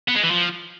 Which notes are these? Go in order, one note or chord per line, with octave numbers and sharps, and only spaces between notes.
B3
G#3
E3
F3